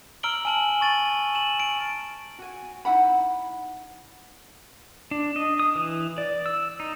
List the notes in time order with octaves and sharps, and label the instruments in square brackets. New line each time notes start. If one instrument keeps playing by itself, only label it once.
[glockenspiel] A#5 E6 F6 D7 F#7 G7
G#5 A5 F#7
C#6 A6 D#7 F#7
E7 F#7
D7
[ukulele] F#4 G#5
D#4 E4 F#5 B5
[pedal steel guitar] D4
D#5
D#6
E3
D5
E6
D#4